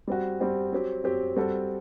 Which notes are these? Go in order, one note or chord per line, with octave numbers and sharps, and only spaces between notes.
G3 C4 F#4
G3 C4 F#4
F#3 C4 G4
F#3 C4 G4
G3 C4 F#4 A4